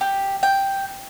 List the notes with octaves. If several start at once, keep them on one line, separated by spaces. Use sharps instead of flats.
G4
G5